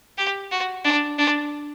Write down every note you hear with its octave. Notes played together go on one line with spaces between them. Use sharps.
G4
F#4
D4
D4